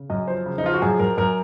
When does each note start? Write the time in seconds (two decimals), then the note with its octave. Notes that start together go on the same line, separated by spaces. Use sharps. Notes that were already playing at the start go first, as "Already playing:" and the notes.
Already playing: C#3
0.10 F#2 D#5
0.28 F3 C5
0.46 C#3
0.58 D#4
0.64 F3 F4
0.74 F#4
0.82 F#2 G#4
0.99 F#2 A#4
1.18 F#2 A#4